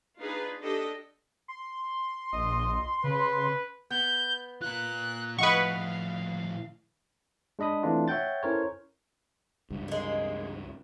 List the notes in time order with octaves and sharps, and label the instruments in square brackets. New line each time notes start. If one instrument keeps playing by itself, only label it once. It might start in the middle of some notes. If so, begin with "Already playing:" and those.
[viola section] D4 D#4 F4 G#4 B4
D4 G4 A4 D#5
[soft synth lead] C6
[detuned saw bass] A#1 [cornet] D#5
[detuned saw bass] C#3 [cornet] B4
[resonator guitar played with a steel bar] B3 [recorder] G6
[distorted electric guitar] F4 A#4 [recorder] F#6
[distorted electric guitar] A2 F3 [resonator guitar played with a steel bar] G#4 D#5 F#5 [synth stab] B4 C#6 [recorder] F5
[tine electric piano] G#3 D4 D#5 B5 D#6
E3 A3 C4 D4 F4
C#5 E5 F#5 G5 G6 A6
C#4 E4 A4 A#4 C5 C#5
[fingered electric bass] C#2 G2
[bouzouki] G#3 A#3